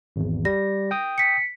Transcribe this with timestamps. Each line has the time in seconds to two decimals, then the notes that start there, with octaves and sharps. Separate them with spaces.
0.16 G#1 E2
0.45 G3 A#6
0.91 G5 D#6
1.18 B6 C#7